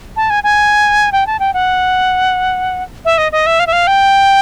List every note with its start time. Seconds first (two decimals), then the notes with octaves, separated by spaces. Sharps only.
0.17 A5
0.30 G#5
0.44 G#5
1.12 G5
1.27 A5
1.40 G5
1.54 F#5
3.05 E5
3.18 D#5
3.32 D#5
3.46 E5
3.60 F5
3.67 E5
3.73 F5
3.87 G5